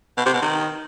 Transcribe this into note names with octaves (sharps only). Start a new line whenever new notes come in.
B2
C3
B2
D#3